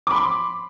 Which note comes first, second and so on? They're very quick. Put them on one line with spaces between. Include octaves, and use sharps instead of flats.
D6 B5 C6